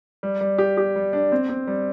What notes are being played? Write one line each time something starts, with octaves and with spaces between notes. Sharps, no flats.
G3
G3
G4
G4
G3
D4
C4
C4
G3